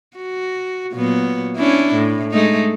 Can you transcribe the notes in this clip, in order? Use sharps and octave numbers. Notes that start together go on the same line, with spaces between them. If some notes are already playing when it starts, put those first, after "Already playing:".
F#4
A#2 F#3 B3
C#4 D4 E4
A2
G#3 A3 D#4